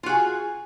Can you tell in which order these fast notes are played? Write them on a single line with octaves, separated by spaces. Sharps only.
F4 F#4 G#4